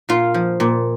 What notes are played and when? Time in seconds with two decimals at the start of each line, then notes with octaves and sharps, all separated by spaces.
0.09 A#2 F4
0.34 F3
0.60 A#2